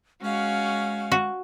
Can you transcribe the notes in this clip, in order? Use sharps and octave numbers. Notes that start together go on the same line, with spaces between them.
G#3 C#4 F#4 F5
F#4